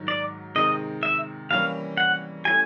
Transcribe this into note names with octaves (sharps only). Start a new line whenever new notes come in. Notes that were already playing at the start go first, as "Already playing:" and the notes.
Already playing: G#2 D#3 F#3
D5
C3 D#3 G#3 C4 D#4 D#5
E5
E3 G3 A#3 C#4 F5
F#5
A3 C#4 E4 G4 G#5